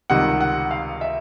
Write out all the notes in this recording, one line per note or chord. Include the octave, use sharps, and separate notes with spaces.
C#2 C3 D#3 G3 F#5
F#5
F5
E5